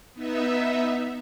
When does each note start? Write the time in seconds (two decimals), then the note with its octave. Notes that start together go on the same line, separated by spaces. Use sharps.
0.14 B3 D#4 E5